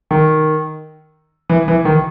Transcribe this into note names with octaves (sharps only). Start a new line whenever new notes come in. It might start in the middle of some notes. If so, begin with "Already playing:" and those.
D#3
E3
E3
D#3